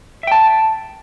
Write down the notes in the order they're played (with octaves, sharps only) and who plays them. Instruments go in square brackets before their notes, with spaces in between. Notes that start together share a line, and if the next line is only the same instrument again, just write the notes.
[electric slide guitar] E5
G5
A5